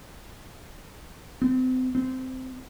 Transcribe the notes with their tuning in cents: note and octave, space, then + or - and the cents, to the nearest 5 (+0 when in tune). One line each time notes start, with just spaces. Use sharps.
C4 -35
C4 -15